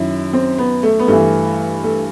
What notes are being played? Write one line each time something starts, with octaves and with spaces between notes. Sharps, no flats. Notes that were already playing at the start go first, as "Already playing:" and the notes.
Already playing: F#2 D#3 E4
C4
B3
A3
B3
G2 E3 A3
A3